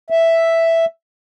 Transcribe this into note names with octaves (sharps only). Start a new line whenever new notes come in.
E5